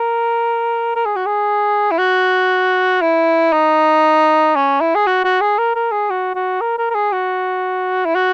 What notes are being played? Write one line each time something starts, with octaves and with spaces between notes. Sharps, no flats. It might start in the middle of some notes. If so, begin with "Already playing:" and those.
Already playing: A#4
A#4
G#4
F#4
G#4
E4
F#4
E4
D#4
C#4
E4
G#4
F#4
F#4
G#4
A#4
A#4
G#4
F#4
F#4
A#4
A#4
A#4
G#4
F#4
E4
F#4